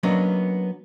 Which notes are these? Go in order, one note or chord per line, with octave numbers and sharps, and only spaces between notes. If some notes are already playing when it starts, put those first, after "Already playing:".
F#3 A#3 B3 C#4 D4 D#5